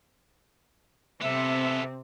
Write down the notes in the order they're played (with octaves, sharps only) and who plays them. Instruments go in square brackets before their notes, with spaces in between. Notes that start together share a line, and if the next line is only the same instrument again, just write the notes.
[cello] C3 [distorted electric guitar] B3 A4 [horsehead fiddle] C4 [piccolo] E5